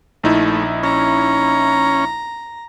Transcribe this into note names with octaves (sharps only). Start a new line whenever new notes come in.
A#1 A3 D#4 E4
C#4 A#5